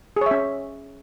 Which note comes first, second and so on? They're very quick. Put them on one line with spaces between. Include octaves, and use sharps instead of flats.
G#4 C#5 E5 C#4